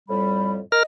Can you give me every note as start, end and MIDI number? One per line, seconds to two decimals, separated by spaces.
0.09 0.61 41
0.09 0.61 45
0.09 0.61 55
0.09 0.52 83
0.72 0.83 70
0.72 0.84 75
0.72 0.83 89